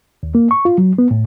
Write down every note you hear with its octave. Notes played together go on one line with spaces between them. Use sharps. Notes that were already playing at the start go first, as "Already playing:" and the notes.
D#2
A#3
C#6
F4
F#3
B3
A2